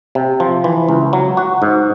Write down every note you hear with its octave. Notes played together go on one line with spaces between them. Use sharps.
C3
F3
E3
C#2
F#3
F#4
G#2